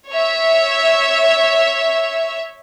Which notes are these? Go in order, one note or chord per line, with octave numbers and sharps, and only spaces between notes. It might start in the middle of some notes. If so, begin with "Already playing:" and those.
C#5 E5